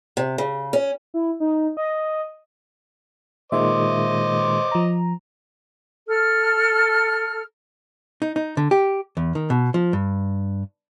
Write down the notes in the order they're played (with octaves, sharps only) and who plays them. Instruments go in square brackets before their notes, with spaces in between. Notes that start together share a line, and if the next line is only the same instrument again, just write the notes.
[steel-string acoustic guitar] C3
C#3
C#4
[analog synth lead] E4
D#4
D#5
[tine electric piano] A#2 D#3 G#3 [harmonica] C5 D#5 D6 [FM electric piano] E5
[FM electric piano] F3 A#5
[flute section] A4 F6
[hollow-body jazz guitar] D#4
D#4
D3
G4
E2
D#3
B2
F3
G2